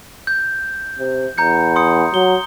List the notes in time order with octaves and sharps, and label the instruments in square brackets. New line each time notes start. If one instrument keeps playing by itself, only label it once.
[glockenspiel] G6
[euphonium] C3
[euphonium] E2 [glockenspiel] A#5 G6 C#7
[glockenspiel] C6 D#6 C#7
[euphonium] F#3 [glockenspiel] G7